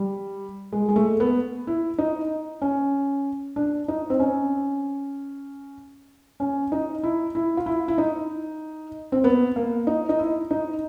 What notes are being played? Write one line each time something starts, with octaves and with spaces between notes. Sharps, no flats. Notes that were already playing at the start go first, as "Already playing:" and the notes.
Already playing: G3
G#3
G#3
A3
B3
E4
D#4
C#4
D4
D#4
C4
C#4
C#4
D#4
E4
E4
F4
E4
E4
D#4
C4
B3
A#3
D#4
D#4
E4
D#4